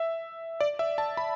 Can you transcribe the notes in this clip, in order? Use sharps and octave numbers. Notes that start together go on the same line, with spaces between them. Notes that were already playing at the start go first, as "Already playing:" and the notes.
Already playing: E5
D5
E5
A5
B5